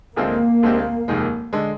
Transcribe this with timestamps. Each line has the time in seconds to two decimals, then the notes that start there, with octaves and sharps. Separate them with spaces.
0.16 D2 D3 G#3 A#3 C4 F4
0.63 D2 D3 G#3 C4 G4
1.08 F1 D#2 D#3 G#3
1.53 D3 G#3